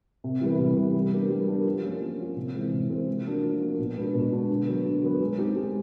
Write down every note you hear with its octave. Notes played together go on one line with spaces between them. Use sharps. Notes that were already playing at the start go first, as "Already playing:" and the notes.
C3
E3 G3 B3
C3
E3 G3 B3
G3
B3 D4 G4 A#4
G3
B3 D4 G4 A#4
F3
A#3 C#4 F4
F3
A#3 C#4 F4
C3
E3 G#3 C4
C3
E3 G#3 C4
F3
A#3 D4 F#4 A#4
F3
A#3 D4 F#4 A#4
B2
G#3 B3 D4 F#4
B2
G#3 B3 D4 F#4
D3
F#3 B3
D3
F#3 B3
G#3
C4 D#4 G4
G#3